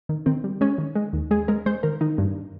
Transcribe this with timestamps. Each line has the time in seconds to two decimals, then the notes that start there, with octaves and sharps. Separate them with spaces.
0.09 D#3
0.26 D#3 C4
0.44 G3
0.61 G#3 C#4
0.78 D#3
0.95 G#3
1.13 D#2
1.31 G#3 G#4
1.48 G#3 A#4
1.66 G#3 C5
1.83 D#3 A#4
2.01 D#3 D#4
2.18 G2